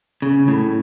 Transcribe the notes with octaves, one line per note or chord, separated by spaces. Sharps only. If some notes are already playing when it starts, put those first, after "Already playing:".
C#3
A2